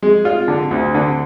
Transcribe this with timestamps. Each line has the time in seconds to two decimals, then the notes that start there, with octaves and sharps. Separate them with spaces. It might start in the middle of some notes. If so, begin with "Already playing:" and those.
0.03 G#3
0.25 F4
0.48 D3
0.71 D2
0.95 D3